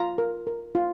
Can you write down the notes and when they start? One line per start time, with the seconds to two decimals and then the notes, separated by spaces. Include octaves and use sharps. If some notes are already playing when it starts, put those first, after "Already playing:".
Already playing: F4 A#5
0.18 A#4
0.47 A#4
0.75 F4